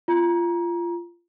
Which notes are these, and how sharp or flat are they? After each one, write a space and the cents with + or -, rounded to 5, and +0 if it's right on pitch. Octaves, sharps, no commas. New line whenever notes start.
F4 -20 A#5 +25